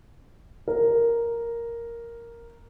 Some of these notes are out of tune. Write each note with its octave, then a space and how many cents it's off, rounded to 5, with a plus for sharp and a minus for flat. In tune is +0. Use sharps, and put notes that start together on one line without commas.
A#4 +0